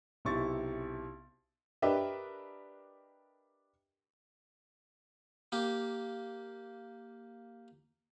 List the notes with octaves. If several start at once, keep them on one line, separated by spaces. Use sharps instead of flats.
B1 C3 E4 C#6 A6
D4 G4 A#4 B4 D#5 E5
A#3 G4